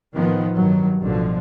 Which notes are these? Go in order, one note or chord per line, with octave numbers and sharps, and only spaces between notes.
A2 D#3 F3 B3
G2 D#3 F#3
A1 B2 D3 F3